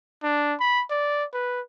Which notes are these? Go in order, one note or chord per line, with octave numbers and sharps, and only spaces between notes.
D4
B5
D5
B4